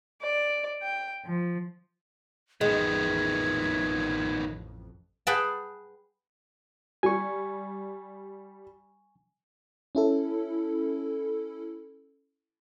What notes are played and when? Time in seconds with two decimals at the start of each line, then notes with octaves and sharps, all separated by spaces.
0.22 D5
0.82 G5
1.25 F3
2.61 A1 F2 D#3 G#3 B3 G#6
5.27 G#4 B4 F#5 G5 A5
7.03 G3 G#5 C#6
9.95 C#4 E4 A4